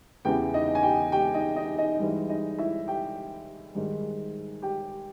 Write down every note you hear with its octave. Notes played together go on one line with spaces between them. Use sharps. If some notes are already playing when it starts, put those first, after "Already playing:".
E2 C#3 E3 G4 G5
D#4 D#5
G#5
G4 G5
G4 G5
D#4 D#5
D#4 D#5
D#4 D#5
G#2 E3 G3
D#4 D#5
E4 E5
G4 G5
G#2 D#3 G3
G4 G5